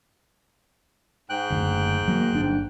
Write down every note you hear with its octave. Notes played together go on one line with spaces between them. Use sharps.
G#2 G5 F#6
F#1 D2
F#3 A#3
G1 D4